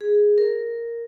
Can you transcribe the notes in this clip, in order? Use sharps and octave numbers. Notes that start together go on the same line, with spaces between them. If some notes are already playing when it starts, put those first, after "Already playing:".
G#4
A#4